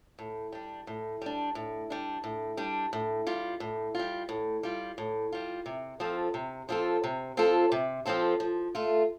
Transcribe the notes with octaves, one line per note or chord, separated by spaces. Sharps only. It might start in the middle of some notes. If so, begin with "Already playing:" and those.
A2
G3 D4
A2
G3 D4
A2
G3 D4
A2
G3 D4
A2
G3 F4
A2
G3 F4
A2
G3 F4
A2
G3 F4
C3
F3 C4 F4 A4
C3
F3 C4 F4 A4
C3
F3 C4 F4 A4
C3
F3 C4 F4 A4
F3
A3 F4